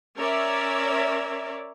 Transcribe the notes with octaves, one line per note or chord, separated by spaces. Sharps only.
C#4 A#4 C#5 D5 E5